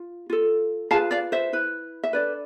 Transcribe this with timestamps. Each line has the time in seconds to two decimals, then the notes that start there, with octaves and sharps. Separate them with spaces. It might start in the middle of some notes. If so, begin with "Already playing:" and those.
Already playing: F4
0.30 F4 A4
0.91 F4 G#4 B4 F5 A5
1.11 D5 F5
1.32 C5 E5
1.53 E4 B4
2.03 E5
2.13 D4 A4 B4 D5